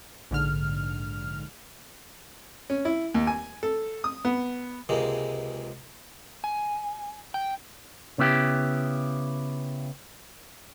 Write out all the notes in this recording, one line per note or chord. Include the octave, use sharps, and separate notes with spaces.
A#1 G#2 D3 F6
C#4
E4
D#2
G#5
A4
D#6
B3
C#2 C3 G#3 A#3
G#5
G5
C#3 B3 E4 G4